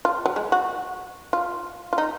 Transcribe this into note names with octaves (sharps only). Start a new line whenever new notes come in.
F4
F#3
G#3
F#4
F4
F4
D#4